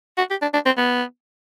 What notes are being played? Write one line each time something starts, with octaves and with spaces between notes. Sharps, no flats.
F#4
G4
D4
D4
C4
B3